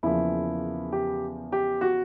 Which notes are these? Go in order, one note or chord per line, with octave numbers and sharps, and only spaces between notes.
E2 C#3 F3 A#3 E4
G4
G4
F#4